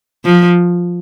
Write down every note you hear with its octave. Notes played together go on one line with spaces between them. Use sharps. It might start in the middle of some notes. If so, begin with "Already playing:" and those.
F3